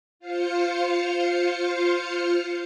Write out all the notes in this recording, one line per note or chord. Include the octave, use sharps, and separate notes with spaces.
F4 C5 F5 C#7